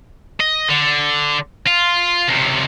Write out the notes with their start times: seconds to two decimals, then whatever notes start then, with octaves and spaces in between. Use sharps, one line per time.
0.40 D#5
0.69 D3
1.67 F4
2.28 C#2 C3